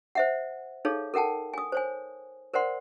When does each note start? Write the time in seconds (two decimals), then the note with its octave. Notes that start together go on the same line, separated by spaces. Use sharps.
0.15 C5 E5 F#5
0.85 D#4 G#4 A4 C#5 F5
1.14 A4 A#4 F#5 G5 A5
1.54 G#5 D#6
1.72 C5 C#5 G#5
2.54 A#4 C5 D5 F#5 C6